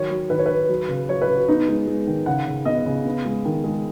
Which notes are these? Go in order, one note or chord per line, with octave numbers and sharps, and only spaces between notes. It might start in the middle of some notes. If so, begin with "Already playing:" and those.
Already playing: D#3 F#3 C#5
F#3
D#3 B4
C#5
D#3 B4
F#3
C#3
F#3 C#5
B4
C#3
F#4
B3 D#4
G#3
G#3
D#3
C#3 F#5
C#3
B3 D#5
C#3
B3
G#3
D#3
G#3